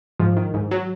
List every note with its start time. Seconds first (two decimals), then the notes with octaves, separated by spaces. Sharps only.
0.19 G#2 F3
0.37 D#3
0.54 G#2
0.71 F#3